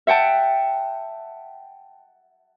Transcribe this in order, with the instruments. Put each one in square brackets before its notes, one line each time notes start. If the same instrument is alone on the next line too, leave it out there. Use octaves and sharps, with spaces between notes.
[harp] E5 F#5 G5 A5